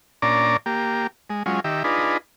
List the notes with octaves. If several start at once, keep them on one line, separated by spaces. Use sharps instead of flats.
A#2 C#4 D4 D5 A#5
A#3 G4
G#3
F#3 G#3 C#4 F4
D#3 G4 E5
D4 D#4 F4 G#4 B4